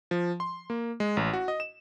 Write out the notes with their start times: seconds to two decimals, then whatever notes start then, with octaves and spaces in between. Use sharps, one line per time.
0.11 F3
0.40 C6
0.70 A#3
1.00 G#3
1.17 A1
1.33 F#4
1.48 D#5
1.60 E7